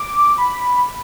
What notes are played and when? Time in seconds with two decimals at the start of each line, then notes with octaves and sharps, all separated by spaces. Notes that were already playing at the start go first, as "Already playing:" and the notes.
Already playing: D6
0.38 B5